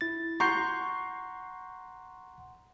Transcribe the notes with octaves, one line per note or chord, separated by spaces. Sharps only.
E4 A6
F#5 A#5 C6 C#6 G6 C7